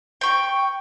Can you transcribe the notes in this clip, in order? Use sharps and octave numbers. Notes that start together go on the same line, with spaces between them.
G5 C#6